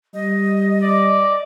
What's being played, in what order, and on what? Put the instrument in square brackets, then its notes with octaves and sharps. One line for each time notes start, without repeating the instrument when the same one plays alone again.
[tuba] G3 [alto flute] D#5
[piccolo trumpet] D5